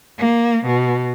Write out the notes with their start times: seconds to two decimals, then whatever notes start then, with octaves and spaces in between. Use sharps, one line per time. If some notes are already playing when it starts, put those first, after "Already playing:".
0.18 A#3
0.66 B2